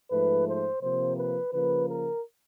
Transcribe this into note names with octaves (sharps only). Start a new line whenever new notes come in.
G#2 F3 A3 B4
C5
C3 F3 A#3 C5
B4
C#3 F3 A#3 B4
A#4